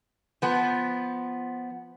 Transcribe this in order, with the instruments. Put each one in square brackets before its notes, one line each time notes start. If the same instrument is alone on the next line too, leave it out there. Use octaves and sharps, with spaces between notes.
[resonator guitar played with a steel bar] F3 B3